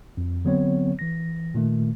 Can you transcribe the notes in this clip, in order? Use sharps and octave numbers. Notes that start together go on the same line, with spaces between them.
F2
D3 F#3 B3 C4 C#5
E3 A#6
A#2 D#3 A3